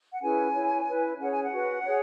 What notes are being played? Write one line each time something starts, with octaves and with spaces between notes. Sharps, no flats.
F#5
C#4 E4 G#4 B4 G#5
E4 C#5
E4 B4
C#4 G#4 C#5 F#5
G#5
F#5
F#4 B4
G#4 C#5